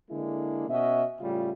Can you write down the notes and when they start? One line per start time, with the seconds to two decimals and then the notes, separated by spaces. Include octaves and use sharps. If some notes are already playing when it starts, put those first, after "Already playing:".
0.10 D3 G#3 A#3 D4 E4
0.68 B2 C#4 F#4 D#5 E5
1.20 A2 C#3 G3 A3 F4